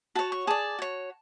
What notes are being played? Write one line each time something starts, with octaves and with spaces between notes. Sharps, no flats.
F#4 C#5 A5
C#6
G#4 D5 A5
F#4 C#5